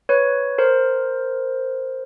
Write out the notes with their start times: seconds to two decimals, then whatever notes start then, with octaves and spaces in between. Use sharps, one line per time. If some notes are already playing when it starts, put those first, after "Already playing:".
0.09 B4 C#5
0.58 A#4 C5